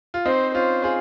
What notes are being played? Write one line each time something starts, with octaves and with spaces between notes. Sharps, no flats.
F4
C4 D#4 C5
C#4 F4 C5
F4 G#4